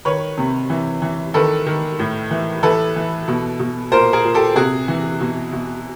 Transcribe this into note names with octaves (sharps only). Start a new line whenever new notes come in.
D#3 B4 C#5
C3
E3
E3
D#3 A4 B4
D#3
A2
E3
E3 A4 B4
E3
B2
B2
A#2 A#4 C5
G#4 A#4
A#2
G4 A4
C3 F#4 G#4
E3
B2
B2